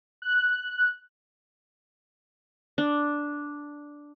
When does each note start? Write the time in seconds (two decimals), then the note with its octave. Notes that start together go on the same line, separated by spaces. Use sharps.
0.22 F#6
2.78 D4